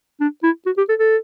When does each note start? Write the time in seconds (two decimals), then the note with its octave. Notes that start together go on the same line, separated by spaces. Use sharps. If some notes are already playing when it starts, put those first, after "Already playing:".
0.20 D4
0.43 E4
0.66 F#4
0.77 G4
0.89 A4
1.00 A4